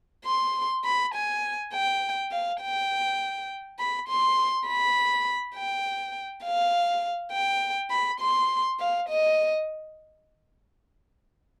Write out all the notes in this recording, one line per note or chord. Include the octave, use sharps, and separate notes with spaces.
C6
B5
G#5
G5
F5
G5
B5
C6
B5
G5
F5
G5
B5
C6
F5
D#5